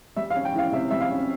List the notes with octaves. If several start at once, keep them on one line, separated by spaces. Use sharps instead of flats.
G3 E5
F5
C#4
G5
E3 F5
C3 E5
G3 E5
F5
C#4